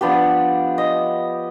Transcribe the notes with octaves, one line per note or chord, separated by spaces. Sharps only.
F3 B3 D4 G4
D#5